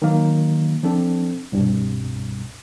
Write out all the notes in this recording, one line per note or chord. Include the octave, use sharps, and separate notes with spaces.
D#3 F#3 A#3
F3 C4 D4 A4
C2 G2 B2